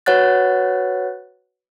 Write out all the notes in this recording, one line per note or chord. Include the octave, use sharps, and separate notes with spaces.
F#4 B4 C#5 F#5 F#6 A6